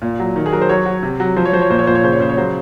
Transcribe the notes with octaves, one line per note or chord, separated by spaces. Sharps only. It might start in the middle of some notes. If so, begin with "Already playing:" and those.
A#2
F#3
D#3
G#4
F#3 A#4
C5
F#3 C#5
F#3
C3
F#3
F3 C5
C#5
F3 C5
C#5
A#2 C5
C#5
A#2 C5
C#5
C#3 C5
C#5
C#3 C5
C#5
F#3 C5